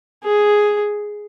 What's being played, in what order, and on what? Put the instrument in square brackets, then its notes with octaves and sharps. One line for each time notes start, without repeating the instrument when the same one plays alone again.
[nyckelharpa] G#4